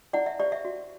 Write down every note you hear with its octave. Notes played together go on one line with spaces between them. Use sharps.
E4 D5 F#5
E5
G4 C5 D5
E5
F#4